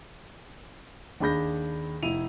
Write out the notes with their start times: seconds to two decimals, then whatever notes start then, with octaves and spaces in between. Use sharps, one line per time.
1.20 D#2 D4 G#4 B5 G6 A#6
2.02 F1 E4 D#7 F7